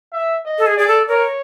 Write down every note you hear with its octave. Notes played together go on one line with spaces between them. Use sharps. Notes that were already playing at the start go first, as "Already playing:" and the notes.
E5
D#5
A4
G#4
G#4 D5
A4
A#4 C#5